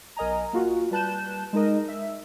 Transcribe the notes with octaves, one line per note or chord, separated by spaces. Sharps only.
B1 A#4 D#5 G#5 A#5
A#3 F4 F#4
G3 B4 A5 F#6 G6 E7
G#3 D#4 A#4 D#5
E5